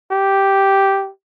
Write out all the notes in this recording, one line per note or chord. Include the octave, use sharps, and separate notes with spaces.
G4